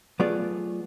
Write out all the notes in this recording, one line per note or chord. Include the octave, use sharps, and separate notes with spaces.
F#3 A3 B3 F4 G#4 D5